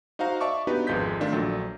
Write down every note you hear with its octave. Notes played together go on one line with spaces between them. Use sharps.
D#4 F#4 C5 F5 A#5
D5 E5 A5 C#6 D6
B3 D4 D#4 F#4 G4 B4
G#1 F2 G#3 F4 G6 B6
D#3 A3 D4 F4
A#1 F#3 A4